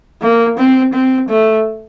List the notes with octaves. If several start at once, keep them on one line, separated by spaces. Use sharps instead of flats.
A#3
C4
C4
A3